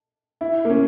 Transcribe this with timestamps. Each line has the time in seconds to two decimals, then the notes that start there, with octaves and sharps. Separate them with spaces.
0.41 E4
0.65 A#3
0.70 C#4